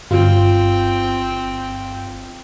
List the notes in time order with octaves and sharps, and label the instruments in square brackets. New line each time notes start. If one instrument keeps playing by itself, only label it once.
[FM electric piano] G1 [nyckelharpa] C4 G5 [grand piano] F4